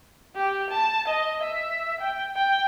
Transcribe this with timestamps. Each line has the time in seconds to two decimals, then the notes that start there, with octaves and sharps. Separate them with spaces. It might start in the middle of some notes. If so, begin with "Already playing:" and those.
0.35 G4
0.70 A5
1.08 D#5
1.42 E5
2.01 G5
2.36 G5